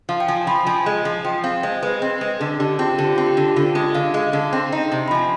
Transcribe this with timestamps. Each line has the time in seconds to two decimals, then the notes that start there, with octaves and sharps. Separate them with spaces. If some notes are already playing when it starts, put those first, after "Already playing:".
0.09 F3 F5
0.20 G5
0.28 F3 G#5
0.47 F3 B5
0.67 F3 G#5
0.86 G#3
1.05 F3
1.25 F3 G5
1.44 C4 F5
1.63 G#3 C5
1.83 G#3 B4
2.02 C4
2.21 G#3
2.40 D3 G#4
2.60 D3 G4
2.79 C4 F4
2.98 D3 G4
3.16 C4 F4
3.27 G4
3.37 D3
3.56 D3 F4
3.75 G#3 D#5
3.95 D3 F5
4.14 G#3 F5
4.33 D3
4.53 C4
4.72 D#4
4.92 C3
5.08 B5
5.11 F3 G#5